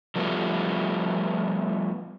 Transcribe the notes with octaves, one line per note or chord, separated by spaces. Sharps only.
F3 G3 A3 B3